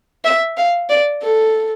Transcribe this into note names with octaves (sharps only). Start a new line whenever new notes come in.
E5
F5
D5
A4